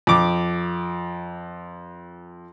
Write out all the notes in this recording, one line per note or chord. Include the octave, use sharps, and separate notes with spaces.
F2 D6